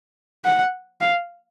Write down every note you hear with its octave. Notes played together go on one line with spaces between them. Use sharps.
F#5
F5